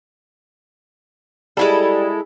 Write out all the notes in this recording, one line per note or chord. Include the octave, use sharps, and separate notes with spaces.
G3 G#3 E4 A4